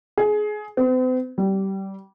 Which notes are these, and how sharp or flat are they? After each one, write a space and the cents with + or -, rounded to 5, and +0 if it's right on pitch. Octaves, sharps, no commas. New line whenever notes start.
G#4 +20
C4 -45
G3 -20